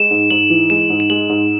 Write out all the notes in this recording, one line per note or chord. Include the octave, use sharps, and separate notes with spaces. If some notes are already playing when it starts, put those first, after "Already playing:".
Already playing: G#3 E7
G#2
G#2 F#7
E3
G#3 E7
G#2
E7
G#3 F#7
G#2